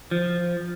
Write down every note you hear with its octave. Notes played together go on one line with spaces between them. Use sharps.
F3